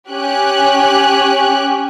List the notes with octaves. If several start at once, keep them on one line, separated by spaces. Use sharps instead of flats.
C#4 G4 G#5 F#6